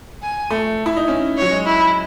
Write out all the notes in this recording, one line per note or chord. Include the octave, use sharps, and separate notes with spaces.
G#5
A3
E4
D#4
C#4
F#3 C#5
G#3
E4